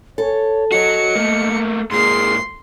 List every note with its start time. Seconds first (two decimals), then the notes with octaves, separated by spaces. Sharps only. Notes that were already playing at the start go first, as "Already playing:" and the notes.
0.18 A4 C#5
0.72 F#4 C#5 D#5 C#7
1.16 A3 A#3
1.91 G#2 A#3 G#4 C6 C7